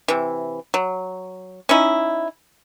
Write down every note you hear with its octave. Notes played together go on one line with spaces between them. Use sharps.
C3 E3
F#3
C#4 D#4 E4